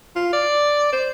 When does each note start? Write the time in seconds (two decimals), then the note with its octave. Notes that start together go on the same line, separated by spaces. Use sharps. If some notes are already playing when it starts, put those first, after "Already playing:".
0.16 F4
0.33 D5
0.93 C5